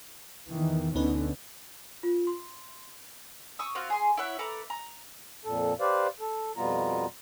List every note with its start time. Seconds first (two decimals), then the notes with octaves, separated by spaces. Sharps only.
0.49 E2 D#3 E3
0.95 D2 D3 B3 C#4 D#4 B4
2.03 F4
2.27 C6
3.59 C#6 D#6 E6
3.75 C4 F4 F#4 F5
3.90 G#4 C6
4.17 E4 C#5 E5 F#5
4.39 A4 B4 A#5 D6
4.70 A#5
5.45 F2 A#2 A4
5.80 G4 B4 C5 D5 F5
6.20 A4
6.57 F2 B2 G3 B3 F4 A#5